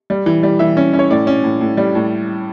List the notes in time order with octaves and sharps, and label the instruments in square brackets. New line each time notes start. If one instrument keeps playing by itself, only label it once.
[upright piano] G3
E3
G3
E3 E5
C#4
C#4
C#5
A2 D5
C#4
A2
A2
G3
A2